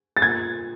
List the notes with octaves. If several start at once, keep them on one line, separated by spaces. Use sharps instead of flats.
A6
A#2 G#6